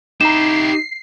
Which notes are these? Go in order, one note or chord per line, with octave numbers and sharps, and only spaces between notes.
D#4 E4 G4 A#5 C7 E7